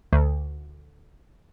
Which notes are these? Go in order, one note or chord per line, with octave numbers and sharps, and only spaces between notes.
D2